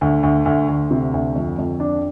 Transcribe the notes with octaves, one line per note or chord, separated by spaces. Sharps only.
D2
D2
D2
D2
C3
D2
F2
F2
D4